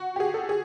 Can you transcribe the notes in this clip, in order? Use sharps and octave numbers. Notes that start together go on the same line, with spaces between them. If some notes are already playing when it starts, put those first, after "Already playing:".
Already playing: F#4
G4
G#4
A4
G#4